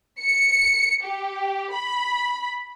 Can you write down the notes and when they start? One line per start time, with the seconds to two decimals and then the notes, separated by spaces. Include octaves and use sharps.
0.22 C#7
1.04 G4
1.73 B5